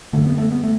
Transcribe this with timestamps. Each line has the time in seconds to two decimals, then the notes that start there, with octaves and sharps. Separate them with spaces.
0.13 F#2 D3 A3
0.26 B3
0.38 A3
0.51 B3
0.63 A3